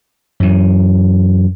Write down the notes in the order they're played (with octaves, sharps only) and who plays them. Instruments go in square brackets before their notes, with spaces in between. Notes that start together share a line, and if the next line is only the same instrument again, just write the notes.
[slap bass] F#2 E3